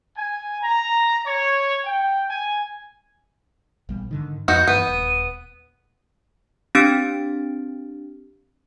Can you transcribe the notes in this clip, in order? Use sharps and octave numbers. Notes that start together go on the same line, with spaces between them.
G#5
A#5
C#5
G5
G#5
A#1 G3 B3
G#2 D3 D#3
F2 B3 D#4 F#4 G6
G2 E3 B3 D#7
D#1
C4 D4 G4 F6 A6 D7